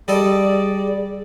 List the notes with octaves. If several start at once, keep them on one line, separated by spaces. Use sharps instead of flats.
G3 G#4 A4 D5 D#5